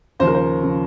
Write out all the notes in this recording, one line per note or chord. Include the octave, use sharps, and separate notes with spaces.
D#2 C#3 F3 C5
A#4
C5
C#3 F3